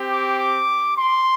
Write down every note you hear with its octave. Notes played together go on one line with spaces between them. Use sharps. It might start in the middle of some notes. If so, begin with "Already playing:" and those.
Already playing: C4 G4
D6
D6
C6